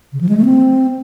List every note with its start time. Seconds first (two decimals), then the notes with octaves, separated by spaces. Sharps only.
0.13 C#3
0.21 F3
0.29 G#3
0.37 A3
0.45 C4